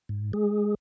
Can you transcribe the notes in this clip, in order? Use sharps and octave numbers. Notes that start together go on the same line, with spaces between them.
G#2
G#3 G#4